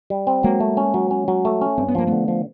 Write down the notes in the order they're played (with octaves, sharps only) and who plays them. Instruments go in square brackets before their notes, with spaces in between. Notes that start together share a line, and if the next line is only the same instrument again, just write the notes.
[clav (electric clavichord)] G3
C4
[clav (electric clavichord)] F#3 [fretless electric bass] G#3 A#3
[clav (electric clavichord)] A3
C#4
F#3
C#4
F#3
A3
C#4
[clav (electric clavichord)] G2 [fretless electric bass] C4
[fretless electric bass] B3
[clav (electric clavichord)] F3 [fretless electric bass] A#3
[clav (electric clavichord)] D3 [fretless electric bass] A3 B3
[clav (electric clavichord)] F3